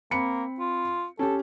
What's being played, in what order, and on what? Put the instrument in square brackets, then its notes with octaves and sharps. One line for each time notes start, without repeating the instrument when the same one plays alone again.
[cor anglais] A#3 [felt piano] C4 B5 C#7
[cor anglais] F4
[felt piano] C#4 G4 [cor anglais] A4